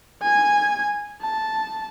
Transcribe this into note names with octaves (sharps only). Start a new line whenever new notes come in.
G#5 G#6
A5